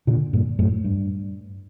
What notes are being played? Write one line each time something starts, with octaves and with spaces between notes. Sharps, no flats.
A#2 D3
G2 A#2
F#2 A2
G2